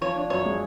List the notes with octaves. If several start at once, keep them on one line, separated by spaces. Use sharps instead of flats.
F3 C#5
D4
F#2 C#5
G#3